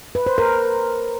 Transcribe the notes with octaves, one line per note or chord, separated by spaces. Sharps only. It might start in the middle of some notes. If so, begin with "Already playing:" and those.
B4
C5
A#4